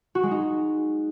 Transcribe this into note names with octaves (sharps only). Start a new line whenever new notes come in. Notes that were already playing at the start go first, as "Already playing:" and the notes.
F#4
G#3
D#4